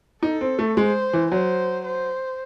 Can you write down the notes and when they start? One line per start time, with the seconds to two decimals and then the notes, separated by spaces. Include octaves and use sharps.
0.23 D#4 A4
0.41 C4
0.59 A3
0.77 G#3 C5
1.13 E3
1.31 F#3 C5
1.85 C5